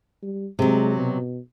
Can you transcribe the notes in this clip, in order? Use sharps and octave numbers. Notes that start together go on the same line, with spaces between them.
G3
C3 F#3 G#3
B2